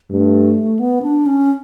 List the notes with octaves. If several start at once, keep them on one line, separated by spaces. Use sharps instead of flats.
G2 A3
B3
D4
C#4